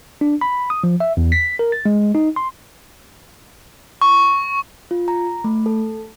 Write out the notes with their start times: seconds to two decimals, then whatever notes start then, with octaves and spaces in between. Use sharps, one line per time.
0.21 D4
0.41 B5
0.70 D#6
0.84 F3
1.00 E5
1.17 E2
1.32 B6
1.59 A#4
1.72 A6
1.86 G#3
2.15 D#4
2.36 C6
4.02 C#6
4.91 F4
5.08 A#5
5.44 A3
5.66 A4